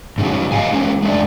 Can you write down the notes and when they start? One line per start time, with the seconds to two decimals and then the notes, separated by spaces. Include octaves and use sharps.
0.18 G#2 C#3 F#3
0.52 C5 D#5 F5 G#5
0.72 G#3 A#3 C#4
1.02 G#3 A3 D4